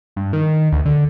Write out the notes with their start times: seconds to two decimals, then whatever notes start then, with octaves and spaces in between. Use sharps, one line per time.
0.16 G2
0.33 D#3
0.72 D2
0.85 D3